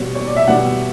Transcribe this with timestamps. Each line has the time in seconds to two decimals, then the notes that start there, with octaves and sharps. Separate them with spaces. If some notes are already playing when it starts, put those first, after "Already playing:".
Already playing: B2 G3 B3 C#5
0.15 C#5
0.26 D5
0.36 E5
0.48 B2 G3 B3 D5 F#5